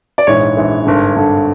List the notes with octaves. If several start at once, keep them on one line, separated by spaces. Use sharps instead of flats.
D5
A#1 G#2 E3 C#5
A#1 G#2 E3
G#1 G2 D3
G#1 G2 D3